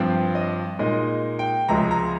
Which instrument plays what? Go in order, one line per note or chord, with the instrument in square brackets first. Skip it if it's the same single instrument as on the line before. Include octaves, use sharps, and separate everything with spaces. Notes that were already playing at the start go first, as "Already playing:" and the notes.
Already playing: [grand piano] G2 F3 C4 G5
D#5
A#2 G#3 D#4 D#5
G5
C#2 C3 F3 G#3 A#5
A#5